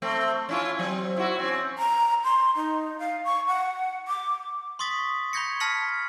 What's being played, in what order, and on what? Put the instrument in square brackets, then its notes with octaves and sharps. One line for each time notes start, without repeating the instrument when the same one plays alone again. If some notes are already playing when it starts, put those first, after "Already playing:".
[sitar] A3 C4
C#4 E4 F4
F#3 C4
E4 F#4
C4 C#4
[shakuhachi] A#5
C6
D#4
F5
C#6
F#5
D6
[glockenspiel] C6 C#6 D#6 A6 B6
B5 C#6 G6 G#6 A#6 C#7
A5 F6 A#6 B6 C#7 F#7